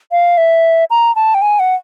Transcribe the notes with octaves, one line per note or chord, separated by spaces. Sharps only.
F5
E5
A#5
A5
G5
G#5
F#5